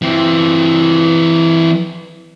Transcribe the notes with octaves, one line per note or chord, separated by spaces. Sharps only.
E3 C4